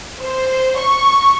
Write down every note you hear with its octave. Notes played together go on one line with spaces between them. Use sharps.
C5
C#6